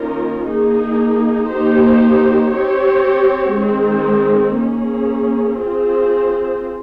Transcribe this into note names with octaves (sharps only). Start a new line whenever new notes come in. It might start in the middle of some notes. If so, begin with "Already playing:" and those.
Already playing: D#3 A#3 C#4 F4 A#4
A#3 D#4 G#4
A#3 D#4 G4 C5
C4 G4 C#5
D#3 G#3 C4
A#3 C#4 G#4
C4 F4 G#4 C5